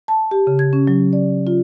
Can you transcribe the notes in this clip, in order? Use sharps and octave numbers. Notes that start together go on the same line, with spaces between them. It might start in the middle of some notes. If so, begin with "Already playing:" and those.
A5
G4
C#3
G#6
C#4
F#3
D5
F4